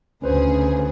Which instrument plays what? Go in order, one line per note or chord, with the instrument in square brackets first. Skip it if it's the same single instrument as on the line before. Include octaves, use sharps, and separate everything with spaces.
[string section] D2 C#3 G#4 [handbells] C#4 B4 C5